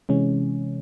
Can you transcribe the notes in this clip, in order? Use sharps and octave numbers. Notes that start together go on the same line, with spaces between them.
C3 E3 G#3 C#4